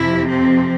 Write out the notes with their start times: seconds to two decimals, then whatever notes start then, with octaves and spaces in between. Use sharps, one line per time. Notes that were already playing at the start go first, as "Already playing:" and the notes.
Already playing: F2 C3 F3 E4
0.28 C4